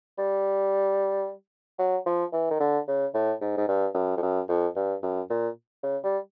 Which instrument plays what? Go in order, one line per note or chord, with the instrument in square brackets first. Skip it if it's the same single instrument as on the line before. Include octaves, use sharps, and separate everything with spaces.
[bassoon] G3
F#3
F3
E3
D#3
D3
C#3
A2
G#2
G#2
G2
F#2
F2
F#2
F2
G2
F#2
A#2
C#3
G3